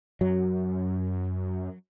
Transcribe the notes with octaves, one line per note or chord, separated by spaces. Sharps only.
F#2 F#3